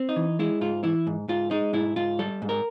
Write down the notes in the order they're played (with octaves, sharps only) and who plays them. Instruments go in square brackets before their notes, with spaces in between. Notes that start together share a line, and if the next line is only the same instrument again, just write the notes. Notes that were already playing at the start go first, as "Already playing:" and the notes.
Already playing: [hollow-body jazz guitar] C4
D#4
E3
G#3 E4
G#2 F4
E3 E4
G#2
G#2 F4
G#3 D#4
G#2 E4
G#2 F4
G3 A4
G#2
A#4